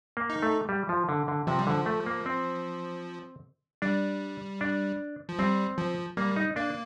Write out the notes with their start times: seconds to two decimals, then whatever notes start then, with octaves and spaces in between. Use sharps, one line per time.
0.17 A#3
0.30 D#4
0.42 A3
0.69 G3
0.89 F3
1.09 D3
1.28 D3
1.47 C3 F3
1.58 G3
1.67 D3 F3
1.86 A3
2.06 A#3
2.26 C4
3.82 G3 D4
4.61 D4
5.29 F3
5.39 G3 C4
5.78 F3
6.17 G3 A#3
6.36 D#4
6.56 A#3 D4